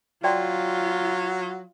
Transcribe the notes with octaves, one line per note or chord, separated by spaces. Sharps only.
F#3 F4 D5 G5 C6